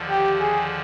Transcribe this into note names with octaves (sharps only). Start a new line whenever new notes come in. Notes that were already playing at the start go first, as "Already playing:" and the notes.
Already playing: D#2 D3 F3
G4
G#4